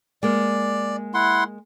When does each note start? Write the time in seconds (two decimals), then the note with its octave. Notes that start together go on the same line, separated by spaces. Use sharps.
0.23 G#3 A#3 D5
1.14 E4 F#5 C6